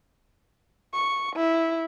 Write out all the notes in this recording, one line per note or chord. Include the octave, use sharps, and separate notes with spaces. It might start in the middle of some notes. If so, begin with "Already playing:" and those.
C#6
E4